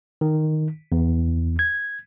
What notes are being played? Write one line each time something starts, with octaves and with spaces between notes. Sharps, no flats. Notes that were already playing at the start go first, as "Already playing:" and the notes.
D#3
E2
G#6